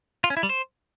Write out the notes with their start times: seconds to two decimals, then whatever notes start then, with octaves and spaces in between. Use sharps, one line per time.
0.24 F4
0.30 C#4
0.37 E4
0.43 G3
0.49 C5